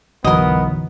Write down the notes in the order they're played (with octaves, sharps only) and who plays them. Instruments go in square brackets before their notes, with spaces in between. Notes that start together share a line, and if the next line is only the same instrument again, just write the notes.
[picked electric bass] B1 F#3 [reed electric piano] F#2 D3 E3 [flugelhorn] B3 [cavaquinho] A#4 D#5